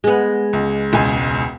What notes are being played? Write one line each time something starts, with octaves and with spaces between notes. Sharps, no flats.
G#3 B3
C#2
E1 C#2 G#5